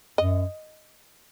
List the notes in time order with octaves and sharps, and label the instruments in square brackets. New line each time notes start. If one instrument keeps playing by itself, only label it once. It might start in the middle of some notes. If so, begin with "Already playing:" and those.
[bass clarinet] F#2 [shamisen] D#5